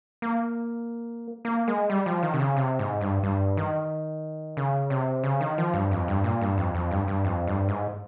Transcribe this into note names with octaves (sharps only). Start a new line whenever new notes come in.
A#3
A#3
G#3
G3
F3
D#3
C3
C#3
C3
G#2
G2
G2
D#3
C#3
C3
C#3
D#3
F3
G2
F2
G2
A#2
G2
F2
F2
G2
G2
F2
G2
G#2